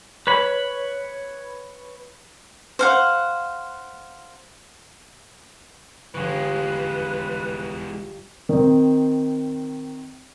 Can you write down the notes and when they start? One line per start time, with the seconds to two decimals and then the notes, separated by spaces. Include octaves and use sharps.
0.27 B4 C#5 B5
2.79 C5 F5 F#5
6.15 G1 E3 F3 G#3 B4 C#6
8.49 D#3 C4